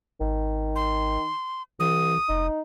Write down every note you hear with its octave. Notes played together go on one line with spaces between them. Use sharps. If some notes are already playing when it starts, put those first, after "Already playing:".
G#1 D#3
C6
C2 E3 D#6
F1 D#4